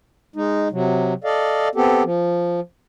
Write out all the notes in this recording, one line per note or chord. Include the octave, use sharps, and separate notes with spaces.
G#3 D#4
C3 F#3
A4 D5 D#5 F5
B3 C4 G4 A4
F3